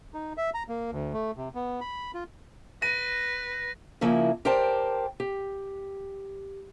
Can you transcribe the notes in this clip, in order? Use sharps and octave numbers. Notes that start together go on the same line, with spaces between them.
D#4
E5
A#5
A#3
D2
A3
C3
B3
B5
F4
B4 A#6 D#7
C#3 F3 A#3 E4
G4 A#4 C5 D5 G5 A5
G4